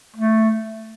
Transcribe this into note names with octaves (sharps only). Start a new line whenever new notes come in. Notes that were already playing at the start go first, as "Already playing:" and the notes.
A3